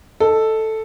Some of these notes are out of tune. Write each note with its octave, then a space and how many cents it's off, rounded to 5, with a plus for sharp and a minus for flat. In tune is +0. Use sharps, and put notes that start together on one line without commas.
A4 +0 D#5 +0